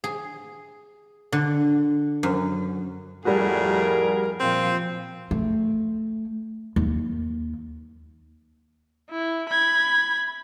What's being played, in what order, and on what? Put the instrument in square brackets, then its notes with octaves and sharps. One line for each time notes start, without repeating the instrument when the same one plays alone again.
[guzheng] G#4
D3
F#2
[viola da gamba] F2 G#4 [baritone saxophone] A2 [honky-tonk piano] G3 F#4 [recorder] A#4
[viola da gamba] A#2 F3 [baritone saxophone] C4
[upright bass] A3
D#2
[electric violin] E4
B5 G#6